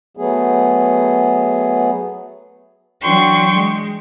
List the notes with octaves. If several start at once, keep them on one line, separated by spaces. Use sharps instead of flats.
F#3 A3 B3 G#4
E3 F#3 D4 G5 C6 C#6
G#3